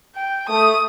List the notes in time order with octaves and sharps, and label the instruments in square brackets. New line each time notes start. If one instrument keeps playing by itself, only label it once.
[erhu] G5
[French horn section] A3 [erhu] D#6